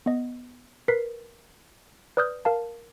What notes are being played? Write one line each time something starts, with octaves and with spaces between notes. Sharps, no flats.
B3 D#5
A#4 B4 B6 C7
B4 D5 D#6 F6 G6
A#4 F5 A5